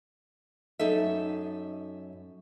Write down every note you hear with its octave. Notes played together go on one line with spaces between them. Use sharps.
F#2 D#4 A4 E5